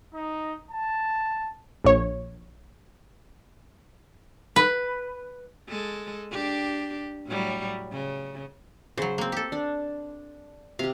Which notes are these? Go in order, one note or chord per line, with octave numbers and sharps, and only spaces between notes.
D#4
A5
A#1 C#5
B4
G#3 A4
D4 G4
A2 F#3 G3
C#3
C#3 F#3 C5
A#3 C4
G4 A4
D4
C3 G4 F5